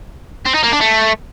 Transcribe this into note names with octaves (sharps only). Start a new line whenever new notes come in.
C4
D#4
A#3
D4
A3